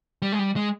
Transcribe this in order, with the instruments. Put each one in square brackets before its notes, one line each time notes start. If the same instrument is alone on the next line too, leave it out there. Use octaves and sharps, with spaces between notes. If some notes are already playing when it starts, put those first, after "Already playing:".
[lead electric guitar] G3
G#3
G3
G#3